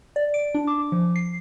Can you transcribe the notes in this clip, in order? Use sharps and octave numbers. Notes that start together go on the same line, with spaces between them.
D5
D7
D4
D6
F3
C7